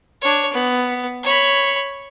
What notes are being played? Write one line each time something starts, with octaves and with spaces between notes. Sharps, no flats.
D4 C#5
B3
C#5 B5